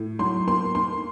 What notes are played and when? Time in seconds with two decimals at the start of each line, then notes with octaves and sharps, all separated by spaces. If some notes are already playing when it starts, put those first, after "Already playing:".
Already playing: A2
0.19 F#3 C6
0.47 A#3 C6
0.75 A#3 C6